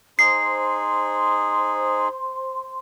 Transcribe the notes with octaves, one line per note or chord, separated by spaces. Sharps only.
D#4 G#4 C5 C6 C7